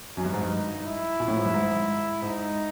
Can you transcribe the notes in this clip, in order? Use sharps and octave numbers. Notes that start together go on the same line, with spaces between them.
F#2 D#4
G2
G#2
G2
E4
A#2
A2
G#2
G2
G#2
G#2 D#4